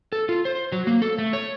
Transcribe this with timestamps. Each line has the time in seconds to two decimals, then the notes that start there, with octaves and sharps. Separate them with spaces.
0.12 A4
0.29 F4
0.45 C5
0.72 F#3
0.87 A#3
1.02 A4
1.18 A3
1.33 C#5